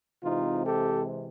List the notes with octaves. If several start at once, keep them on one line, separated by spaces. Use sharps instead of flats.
C3 E3 G#3 C4 D#4 F4
G4 A4